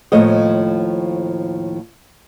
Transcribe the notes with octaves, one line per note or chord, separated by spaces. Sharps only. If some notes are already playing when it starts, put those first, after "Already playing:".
D#2 A2 F3 A3 C#5 D#5